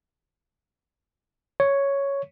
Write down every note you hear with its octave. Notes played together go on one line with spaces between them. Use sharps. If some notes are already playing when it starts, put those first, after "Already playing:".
C#5